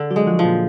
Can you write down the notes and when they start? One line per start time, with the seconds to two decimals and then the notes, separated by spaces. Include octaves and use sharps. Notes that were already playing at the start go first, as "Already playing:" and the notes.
Already playing: D3
0.11 F#3 F#4
0.16 G#3
0.27 F3 F4
0.39 F3
0.44 A#2 A#3